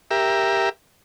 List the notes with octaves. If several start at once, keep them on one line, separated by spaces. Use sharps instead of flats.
G4 A#4 E5